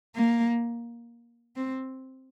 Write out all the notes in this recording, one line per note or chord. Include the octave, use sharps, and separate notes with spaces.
A#3
C4